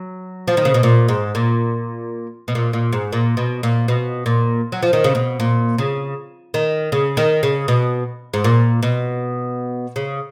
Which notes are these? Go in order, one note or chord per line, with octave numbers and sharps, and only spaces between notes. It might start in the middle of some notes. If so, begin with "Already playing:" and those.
Already playing: F#3
F3
D#3
C#3
B2
A#2
G#2
A#2
B2
A#2
A#2
G#2
A#2
B2
A#2
B2
A#2
F#3
F3
D#3
C#3
B2
A#2
C#3
D#3
C#3
D#3
C#3
B2
G#2
A#2
B2
C#3